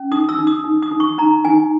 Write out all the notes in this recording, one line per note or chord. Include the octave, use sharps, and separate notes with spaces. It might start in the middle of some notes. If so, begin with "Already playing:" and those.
Already playing: C#4
D#4 D#6
E6
D#4
D#6
D#4
D#6
D#4
C#6
D#4 A#5
D#4 G#5